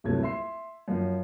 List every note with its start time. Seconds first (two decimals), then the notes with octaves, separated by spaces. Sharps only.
0.04 D1 C2 C3 F#3 A3 G#6
0.23 E5 C6 C7
0.88 F#2 F3 C#4